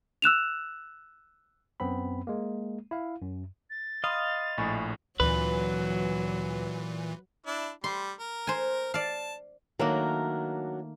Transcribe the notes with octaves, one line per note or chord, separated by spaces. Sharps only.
E6 F#6 E7 F7
F#2 B3 C4 B5
G#3 A#3
E4 F5
F#2
A6
D#5 F5 B5 C6 D#6
A#1 A2 G#5 B5 C#6
D2 A#2 E3 F#3 C4 B4
D4 E4
G3 C6
A#4
C5 G#5
D5 F5 A5
D#3 F#3 A3 A#3 D4 A#4